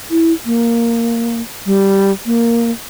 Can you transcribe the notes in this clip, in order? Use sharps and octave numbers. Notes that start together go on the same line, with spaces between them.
E4
A#3
G3
A#3